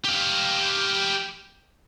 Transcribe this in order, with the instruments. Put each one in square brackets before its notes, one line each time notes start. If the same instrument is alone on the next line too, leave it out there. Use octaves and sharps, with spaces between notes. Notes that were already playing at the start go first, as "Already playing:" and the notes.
[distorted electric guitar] G4 F5